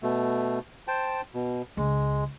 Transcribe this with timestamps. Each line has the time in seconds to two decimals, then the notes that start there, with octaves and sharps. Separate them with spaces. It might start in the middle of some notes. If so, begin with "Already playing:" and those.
0.03 B2 A3
0.88 C5 G5 A5
1.34 B2
1.77 C#2 G#3